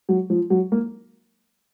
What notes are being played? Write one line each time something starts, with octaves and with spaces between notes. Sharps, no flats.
F#3
F3
F#3
A#3